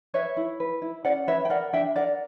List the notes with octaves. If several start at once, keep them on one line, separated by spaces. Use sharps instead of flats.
B4 C#5 E5
E4
B4
E4
C#4 D5 F#5
B4 C#5 E5
G5
A#4 D5 F#5
D4 E5 G5
A#4 D5 F#5